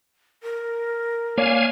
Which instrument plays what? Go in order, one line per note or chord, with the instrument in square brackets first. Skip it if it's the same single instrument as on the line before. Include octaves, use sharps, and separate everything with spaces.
[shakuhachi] A#4
[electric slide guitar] A#3 C#5 D5 [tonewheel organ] F5 G#5